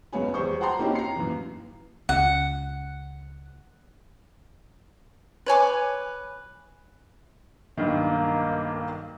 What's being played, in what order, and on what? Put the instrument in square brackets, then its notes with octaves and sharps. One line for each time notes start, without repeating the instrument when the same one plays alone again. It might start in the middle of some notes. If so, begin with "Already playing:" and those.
[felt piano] F#1 C#2 B3 C#5 G#5
E2 G3 C5 C#6
C5 F#5 G5 A5 A#5 C6
A#3 C4 C#4 D#4 E4 G4
A#5 C7
F#2 A#2 E3
[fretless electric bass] C#2 [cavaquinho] F#5
[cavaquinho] B4 C#5 G#5 D6
[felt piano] B1 G2 D#3 [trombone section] A#3